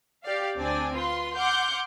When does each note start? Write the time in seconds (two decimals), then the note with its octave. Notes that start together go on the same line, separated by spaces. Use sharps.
0.24 G4 D5 F5
0.56 D2 C4 D4 D5 G#5
0.94 F4 B4 C6
1.36 F#5 C6 D6 F6 G6